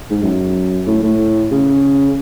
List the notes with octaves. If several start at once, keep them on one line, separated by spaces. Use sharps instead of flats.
G#2
F#2
A2
A2
C#3